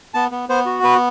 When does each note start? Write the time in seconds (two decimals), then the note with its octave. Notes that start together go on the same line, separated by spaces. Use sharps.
0.14 B3 A5
0.31 B3
0.49 B3 C5
0.66 F#4
0.83 B3 B4